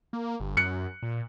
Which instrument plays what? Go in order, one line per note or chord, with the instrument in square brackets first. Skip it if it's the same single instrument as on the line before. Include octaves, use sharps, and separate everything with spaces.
[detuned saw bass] A#3
G1
[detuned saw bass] F#2 [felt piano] F#6 C#7
[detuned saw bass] A#2